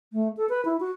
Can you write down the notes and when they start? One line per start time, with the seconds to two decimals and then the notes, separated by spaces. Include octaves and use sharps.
0.13 A3
0.37 A4
0.49 B4
0.65 E4
0.80 F#4